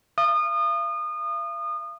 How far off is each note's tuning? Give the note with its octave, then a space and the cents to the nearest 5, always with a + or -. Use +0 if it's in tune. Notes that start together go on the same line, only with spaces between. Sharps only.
F5 -45 D#6 -30